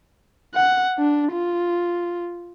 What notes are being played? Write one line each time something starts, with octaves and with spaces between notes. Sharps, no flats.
F#5
D4
F4